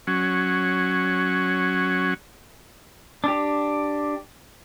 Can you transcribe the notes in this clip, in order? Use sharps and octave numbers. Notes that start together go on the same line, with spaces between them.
F#3 C#4
D4 G4